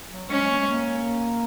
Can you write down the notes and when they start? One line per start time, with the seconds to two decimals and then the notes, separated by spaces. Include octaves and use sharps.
0.11 F#3
0.29 G#3 C#4
0.44 G#3
0.49 A#3
0.58 G#3
0.67 A#3